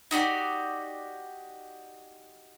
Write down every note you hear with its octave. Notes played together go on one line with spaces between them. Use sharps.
D#4 F#4 G4 D5